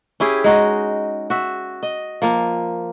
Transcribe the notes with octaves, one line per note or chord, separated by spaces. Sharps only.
C#4 E4 G4 G#4
G#3 D#4 F#4
F#4 E5
D#5
F3 A#3